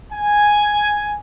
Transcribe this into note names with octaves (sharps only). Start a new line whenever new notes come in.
G#5